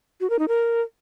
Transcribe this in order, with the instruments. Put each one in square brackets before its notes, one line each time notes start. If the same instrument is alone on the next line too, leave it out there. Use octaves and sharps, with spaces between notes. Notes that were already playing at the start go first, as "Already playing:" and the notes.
[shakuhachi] F#4
A#4
D#4
A#4